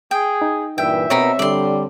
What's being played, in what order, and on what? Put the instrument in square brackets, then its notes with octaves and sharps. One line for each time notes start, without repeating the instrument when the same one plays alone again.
[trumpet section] G#4 [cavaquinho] G5
[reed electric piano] D#4
[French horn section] G2 A#2 E3 [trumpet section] E5 [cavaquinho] G5
[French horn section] B2 [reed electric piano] C4 C#5 [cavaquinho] D#4 A#4 B5
[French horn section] D3 G3 [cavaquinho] D5 C6